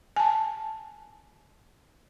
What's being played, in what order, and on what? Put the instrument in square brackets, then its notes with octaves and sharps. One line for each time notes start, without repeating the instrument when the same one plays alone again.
[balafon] G#5 A5